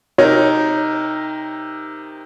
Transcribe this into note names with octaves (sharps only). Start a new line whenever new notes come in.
C3 D#4 F#4 A#4 C#5